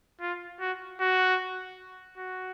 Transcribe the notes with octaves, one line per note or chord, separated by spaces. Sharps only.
F4
F#4
F#4
F#4